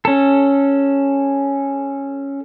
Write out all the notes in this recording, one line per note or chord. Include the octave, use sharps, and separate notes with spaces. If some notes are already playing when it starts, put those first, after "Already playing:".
C#4 A4